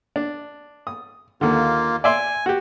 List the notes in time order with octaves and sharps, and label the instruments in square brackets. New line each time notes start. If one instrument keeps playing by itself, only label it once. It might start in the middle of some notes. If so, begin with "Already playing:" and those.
[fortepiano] D4
D#6
[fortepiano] D#2 D3 [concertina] A#3 F4
[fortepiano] D5 E5 C6 [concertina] G#5
[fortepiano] F#4 G4